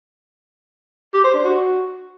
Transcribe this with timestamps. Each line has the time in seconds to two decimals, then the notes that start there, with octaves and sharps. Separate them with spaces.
1.14 G4
1.24 C5
1.34 D4
1.44 F#4